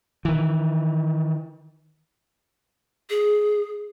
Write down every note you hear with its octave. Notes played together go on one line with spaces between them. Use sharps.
D#3 E3
G#4